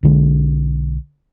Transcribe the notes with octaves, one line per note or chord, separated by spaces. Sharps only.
B1 D3 G#3